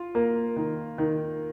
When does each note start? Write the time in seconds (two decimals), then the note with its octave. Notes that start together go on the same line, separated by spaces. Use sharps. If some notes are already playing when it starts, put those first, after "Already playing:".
Already playing: F4
0.15 A#3
0.56 D#3
0.98 D#3